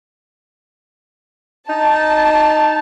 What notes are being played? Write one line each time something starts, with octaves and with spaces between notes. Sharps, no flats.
D#4 A5